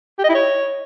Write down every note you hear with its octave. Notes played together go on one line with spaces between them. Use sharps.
G4
D#5
E4
C#5